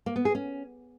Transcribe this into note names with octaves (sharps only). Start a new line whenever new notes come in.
A#3
B3
G#4
C#4